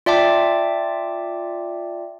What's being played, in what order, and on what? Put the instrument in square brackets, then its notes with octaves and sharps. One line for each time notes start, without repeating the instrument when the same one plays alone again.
[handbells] F4 D5 E5 G5 A5 D6